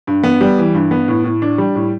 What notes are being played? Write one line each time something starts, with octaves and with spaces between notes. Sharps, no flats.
G2
B3
G3
E3
G2
B3
A2
A2
D4
G3
A2